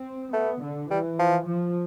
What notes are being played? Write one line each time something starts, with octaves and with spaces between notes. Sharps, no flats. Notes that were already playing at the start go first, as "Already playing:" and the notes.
Already playing: C4
A3 B3
D3
E3 G3
F3
F3